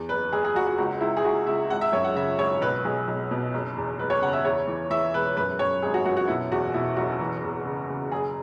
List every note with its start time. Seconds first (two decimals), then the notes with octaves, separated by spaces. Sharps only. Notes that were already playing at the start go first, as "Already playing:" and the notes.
Already playing: E2
0.09 F#1 B4
0.32 F#1 G#4
0.44 G#4
0.55 F#1 F#4
0.67 F#4
0.78 C#2 F#4
1.01 C#2 E4
1.17 G#4
1.24 C#2 F#4
1.47 C#2 E5
1.70 G#1 F#5
1.81 E5
1.93 F#2 C#5
2.04 F#5
2.15 C#3 E5
2.39 G#1 C#5
2.61 B1 B4
2.85 B1 G#4
3.08 B1
3.31 B2
3.54 F#1
3.77 E2
3.99 F#1 B4
4.10 C#5
4.22 C#3 F#5
4.33 E5
4.45 E2 C#5
4.68 E3
4.90 E3 E5
5.14 E1 B4
5.37 F#2 B4
5.59 F#2 C#5
5.82 G#1 G#4
5.94 F#4
6.06 F#2 F#4
6.17 F#4
6.28 B2 E4
6.52 E2 F#4
6.74 B2 E4
6.96 F#1 F#4
7.20 E3
7.44 E2
7.65 C#3
7.89 C#3
8.12 F#1 G#4